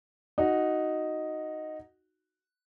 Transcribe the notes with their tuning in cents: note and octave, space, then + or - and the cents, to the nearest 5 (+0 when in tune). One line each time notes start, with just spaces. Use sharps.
D#4 +0 F#4 +0